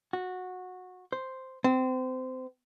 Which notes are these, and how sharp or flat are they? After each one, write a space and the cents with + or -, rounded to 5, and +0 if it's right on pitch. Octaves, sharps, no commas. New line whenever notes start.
F#4 -15
C5 +0
C4 -25